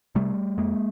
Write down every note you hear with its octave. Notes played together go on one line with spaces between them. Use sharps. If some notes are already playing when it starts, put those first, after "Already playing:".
C3 G3 A3
F2 G#3 A#3